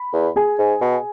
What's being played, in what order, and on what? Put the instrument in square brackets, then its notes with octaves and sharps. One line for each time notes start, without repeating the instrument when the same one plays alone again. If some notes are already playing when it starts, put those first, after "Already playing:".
Already playing: [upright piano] B5
[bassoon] E2
[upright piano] G#4 G#5
[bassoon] G#2
B2